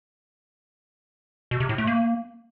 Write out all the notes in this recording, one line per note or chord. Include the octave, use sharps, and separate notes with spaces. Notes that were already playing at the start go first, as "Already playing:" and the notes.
B2
C3
A2
A3
A#3